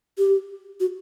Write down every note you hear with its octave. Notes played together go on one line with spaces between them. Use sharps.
G4
F#4